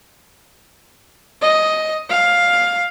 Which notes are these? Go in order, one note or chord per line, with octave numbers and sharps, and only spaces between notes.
D#5
F5